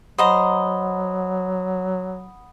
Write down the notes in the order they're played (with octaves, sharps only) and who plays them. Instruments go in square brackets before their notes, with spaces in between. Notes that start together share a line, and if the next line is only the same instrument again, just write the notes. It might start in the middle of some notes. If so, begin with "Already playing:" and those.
[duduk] F#3 [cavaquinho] C5 D#5 A#5 [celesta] F#5 B5 D#6